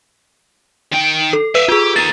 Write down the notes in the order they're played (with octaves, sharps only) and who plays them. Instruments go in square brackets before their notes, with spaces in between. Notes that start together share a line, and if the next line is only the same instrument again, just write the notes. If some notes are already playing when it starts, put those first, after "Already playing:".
[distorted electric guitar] D#3 G5
[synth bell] A4
[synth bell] B4 E6 D#7 [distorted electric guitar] E5 F5
[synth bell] F4 G#4 [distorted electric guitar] G4
[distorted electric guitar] A#3 D#4 [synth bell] A6